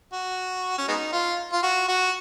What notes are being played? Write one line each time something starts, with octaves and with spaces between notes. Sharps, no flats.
F#4
C#4
G#3 B3 D#4
F4
F4
F#4
F#4